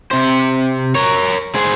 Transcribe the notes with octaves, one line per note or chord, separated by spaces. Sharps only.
C3 C5
A#4 C#5
C4 G#4